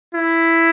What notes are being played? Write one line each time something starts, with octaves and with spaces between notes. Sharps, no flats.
E4